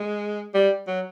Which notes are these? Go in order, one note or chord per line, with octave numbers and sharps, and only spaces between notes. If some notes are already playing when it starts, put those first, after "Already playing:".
Already playing: G#3
G3
F#3